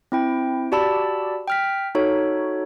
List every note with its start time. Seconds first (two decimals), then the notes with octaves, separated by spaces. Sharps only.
0.12 C4 E4 G5
0.72 F#4 G4 D5 A5 B5 E6
1.48 G5 F6 B6
1.95 D#4 F#4 A4 C#5